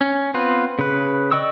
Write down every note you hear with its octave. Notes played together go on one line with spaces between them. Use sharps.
C#4
B3 C4 F4 B4
C#3 B4
D5 D#5 G5 C#6 E6